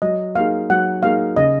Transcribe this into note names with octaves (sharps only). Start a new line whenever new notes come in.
F#3 D#5
A#3 D#4 G#4 F5
F#3 F#5
A#3 D#4 G#4 F5
C#3 D#5